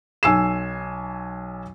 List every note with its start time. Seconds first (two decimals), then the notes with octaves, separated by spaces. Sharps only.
0.23 B1 G#5 E6 C7 E7